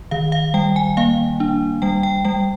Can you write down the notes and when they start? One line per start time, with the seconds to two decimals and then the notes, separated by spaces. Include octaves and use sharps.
0.11 D#3 F5
0.32 F5
0.54 G3 G5
0.76 G#5
0.97 A#3 F5
1.40 D4
1.82 G3 G5
2.03 G5
2.25 G3 G5